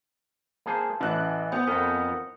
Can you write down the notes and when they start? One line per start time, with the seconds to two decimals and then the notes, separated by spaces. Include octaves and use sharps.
0.66 A#3 G#4 C5 A5
1.00 A1 E3 C#4 F#6
1.52 B3 C5 G#5 D#6
1.67 F2 A#4 F#5 D#6 G6 A#6